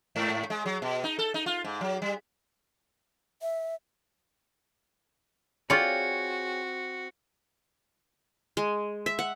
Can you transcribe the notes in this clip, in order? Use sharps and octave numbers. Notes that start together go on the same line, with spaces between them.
G#2
G#3
F#3
B2
D#4
A4
D#4
F4
G#2
F#3
G3
E5
C4 F4 F#4 G#4 C#5 D5 G5 C#7
G#3
E5
F#5